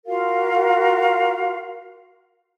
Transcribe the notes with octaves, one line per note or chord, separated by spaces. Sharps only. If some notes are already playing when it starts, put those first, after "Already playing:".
F4 F#4 A#4 F5